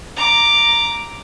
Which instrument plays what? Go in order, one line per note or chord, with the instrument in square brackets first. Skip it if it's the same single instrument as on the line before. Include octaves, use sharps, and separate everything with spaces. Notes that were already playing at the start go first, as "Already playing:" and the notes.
[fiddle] A#5 D6